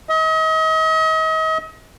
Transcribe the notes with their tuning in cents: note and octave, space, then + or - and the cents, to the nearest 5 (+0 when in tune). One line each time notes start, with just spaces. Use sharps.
D#5 +40